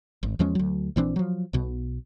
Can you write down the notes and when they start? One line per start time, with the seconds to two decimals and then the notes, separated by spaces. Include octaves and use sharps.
0.23 G#1
0.39 E2 F3 G#3 C#4
0.55 D2 F#3
0.96 A#1 E3 C4 D4
1.16 F3 F#3
1.53 B1 B2